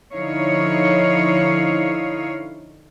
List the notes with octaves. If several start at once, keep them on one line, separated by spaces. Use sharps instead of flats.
D3 F3 D#4 E4 C#5 F5